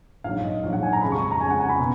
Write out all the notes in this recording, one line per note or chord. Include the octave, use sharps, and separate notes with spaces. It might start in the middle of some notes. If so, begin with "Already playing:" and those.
A#1 G#2 F#3 F5
D#5
A#1 G#2 F#3 F5
F#5
G#5
A#5
F2 C#3 G#3 B5
C#6
A#5
F2 C#3 G#3 G#5
F#5
G#5
B5
B2